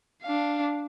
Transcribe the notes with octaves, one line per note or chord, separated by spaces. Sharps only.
D4 F5